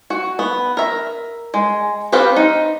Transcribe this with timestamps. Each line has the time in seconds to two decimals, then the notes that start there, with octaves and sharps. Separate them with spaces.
0.10 F#4
0.39 B3
0.77 A#4 E5
1.54 G#3
2.12 B3 C4 G4 B4 F5
2.36 D#4